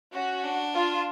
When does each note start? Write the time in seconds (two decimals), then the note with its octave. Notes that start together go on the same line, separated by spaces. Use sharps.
0.13 C#4 F#4
0.44 D4
0.74 F4